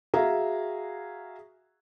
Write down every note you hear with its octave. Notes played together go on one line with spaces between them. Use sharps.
F#4 G#4 E5 F5 A#5